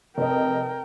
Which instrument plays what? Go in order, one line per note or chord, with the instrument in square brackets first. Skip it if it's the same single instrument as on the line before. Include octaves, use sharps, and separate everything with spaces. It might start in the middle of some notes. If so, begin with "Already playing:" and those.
[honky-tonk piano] F1 C3 D#5 [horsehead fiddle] A#4 G5